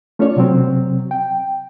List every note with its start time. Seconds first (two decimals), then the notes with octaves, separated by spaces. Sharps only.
0.19 A3 C#4 D4 F4 C#5 D5
0.36 C3 F#3 C4
1.11 G5